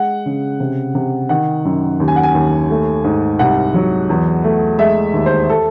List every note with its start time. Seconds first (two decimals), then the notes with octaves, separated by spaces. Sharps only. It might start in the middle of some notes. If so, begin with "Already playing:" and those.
Already playing: G#3 F#5
0.26 C#3
0.60 C3
0.95 C3
1.29 D#3 F#5
1.65 F#2
2.00 D#2
2.08 G#5
2.16 F#5
2.23 G#5
2.34 D#2
2.70 A3
3.04 G#2
3.39 C2 F#5
3.74 F#3
4.10 E2
4.44 A3
4.79 G#3 E5
5.14 D#2
5.26 C5
5.50 A4